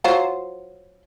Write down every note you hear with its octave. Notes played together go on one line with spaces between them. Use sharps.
F#3 F4 C5